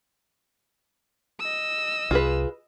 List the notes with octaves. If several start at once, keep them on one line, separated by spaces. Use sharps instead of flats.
D#5 E6
C2 F4 G#4 B4